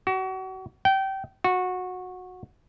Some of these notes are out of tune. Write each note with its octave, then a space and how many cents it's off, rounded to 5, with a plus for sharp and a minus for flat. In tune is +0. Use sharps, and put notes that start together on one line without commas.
F#4 +30
G5 -25
F#4 -20